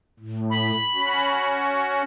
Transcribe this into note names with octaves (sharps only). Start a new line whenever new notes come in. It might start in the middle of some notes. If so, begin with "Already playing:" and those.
A2
B5
C#4 F#4